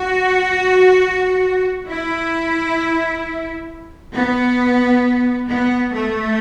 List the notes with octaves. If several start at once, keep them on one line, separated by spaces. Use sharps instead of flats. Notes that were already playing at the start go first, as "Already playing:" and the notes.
Already playing: F#4
E4
B3
B3
A3